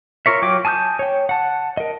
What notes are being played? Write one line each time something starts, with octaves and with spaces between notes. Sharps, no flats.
F4 A#4 C#5 E5
F#3 F4 C#5 G5 D6
G#5 A5 D#6 F6 G6
C#5 G5
F#5 A5
A#4 D#5